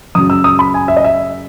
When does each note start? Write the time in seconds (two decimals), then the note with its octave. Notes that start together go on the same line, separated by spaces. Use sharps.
0.15 F#2 C#3 F#3 D#6
0.30 E6
0.44 D#6
0.59 B5
0.74 G#5
0.88 E5
0.97 D#5
1.04 E5